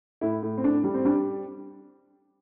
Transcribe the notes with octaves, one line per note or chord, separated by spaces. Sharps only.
A2 E4
A2
C4
A2 D4
G3
C4
G3 D4